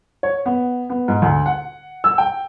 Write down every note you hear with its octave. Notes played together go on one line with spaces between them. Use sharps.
C#5
B3
B3
G#2
D2
F#5
E6
G5